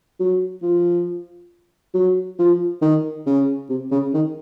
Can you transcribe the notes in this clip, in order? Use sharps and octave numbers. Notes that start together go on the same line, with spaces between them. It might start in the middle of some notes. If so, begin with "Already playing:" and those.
F#3
F3
F#3
F3
D#3
C#3
C3
C#3
D#3